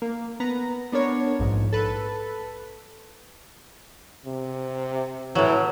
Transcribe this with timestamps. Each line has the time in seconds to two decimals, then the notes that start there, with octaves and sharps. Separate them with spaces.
0.02 A#3
0.40 B3 B4 A#5
0.92 B3 D4 A#4 C#5
1.39 A#1 G#2
1.73 A4 B4
4.26 C3
5.35 A2 E3 F#3